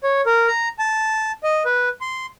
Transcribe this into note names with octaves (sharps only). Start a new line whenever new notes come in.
C#5
A#4
A#5
A5
D#5
B4
C6